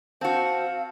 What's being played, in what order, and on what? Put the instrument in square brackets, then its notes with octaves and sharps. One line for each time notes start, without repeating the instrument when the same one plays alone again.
[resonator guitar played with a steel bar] C4 F#4 [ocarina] F5 [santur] A5